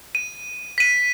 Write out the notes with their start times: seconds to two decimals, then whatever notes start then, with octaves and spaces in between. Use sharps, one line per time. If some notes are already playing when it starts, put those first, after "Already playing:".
0.15 D#7
0.78 B6 D#7